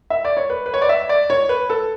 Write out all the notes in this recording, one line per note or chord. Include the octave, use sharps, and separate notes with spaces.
E5
D5
C#5
B4
B4
C#5
D5
E5
D5
C#5
B4
A4